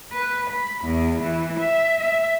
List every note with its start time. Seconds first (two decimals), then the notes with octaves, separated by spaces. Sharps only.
0.12 B4
0.51 B5
0.85 E2
1.24 E3
1.60 E5
2.00 E5